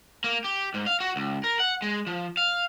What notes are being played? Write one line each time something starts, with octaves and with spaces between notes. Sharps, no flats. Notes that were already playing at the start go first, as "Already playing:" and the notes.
A#3
G4
G#2
F5
F#4
C#2
A#4
F#5
G#3
F3
F5